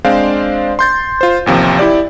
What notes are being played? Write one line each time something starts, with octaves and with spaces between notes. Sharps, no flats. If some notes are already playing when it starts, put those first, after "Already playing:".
G#3 C4 D4 C5 D5 F5
C6 G6 A6
F4 C5
A1 D#2 C3 F3
E4 G4 D5